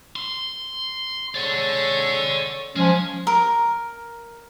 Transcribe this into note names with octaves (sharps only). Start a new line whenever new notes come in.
C6
G#3 A4 C#5 D5 F#5
F3 G#3 C#4
A#4